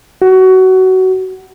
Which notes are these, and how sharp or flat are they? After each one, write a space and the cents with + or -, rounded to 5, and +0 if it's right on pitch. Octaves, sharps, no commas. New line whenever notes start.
F#4 +20